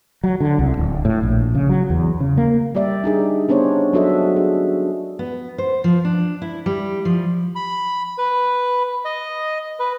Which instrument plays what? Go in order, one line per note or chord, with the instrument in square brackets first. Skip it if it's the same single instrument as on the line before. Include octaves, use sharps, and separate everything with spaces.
[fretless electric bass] F#3
D3
C2
D1
A2
A#1
C#3
F#3
E2
C#3
A#3
[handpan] G3 G4 D5 E5
D4 D#4 G#4
B3 C#4 D4 C5 C#5
F#3 C#4 F#4 A4 D#5 E5
D4 G#4
[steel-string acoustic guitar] B3
C5
F3
D4
E4
G3
F3
[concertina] B5
B4
D#5
B4